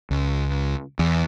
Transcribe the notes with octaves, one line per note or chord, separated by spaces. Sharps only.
C#2
E2